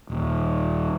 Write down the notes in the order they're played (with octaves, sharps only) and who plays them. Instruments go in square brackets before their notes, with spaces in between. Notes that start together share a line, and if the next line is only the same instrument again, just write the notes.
[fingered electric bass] D#1